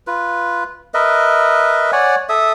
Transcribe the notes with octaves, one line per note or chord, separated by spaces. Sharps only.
F4 B4
A#4 B4 D#5 E5
C#5 D5 F#5 G#5
A4 E5 D#6